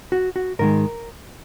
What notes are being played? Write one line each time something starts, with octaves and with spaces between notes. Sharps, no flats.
F#4
F#4
G#2 D#3 G#3 A#4